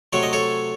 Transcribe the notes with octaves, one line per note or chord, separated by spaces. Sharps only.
C3 F#3 A3 C#5
D#5
A4 C#5